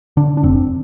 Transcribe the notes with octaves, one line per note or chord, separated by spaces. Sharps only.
D3 D4
D4
F1 C4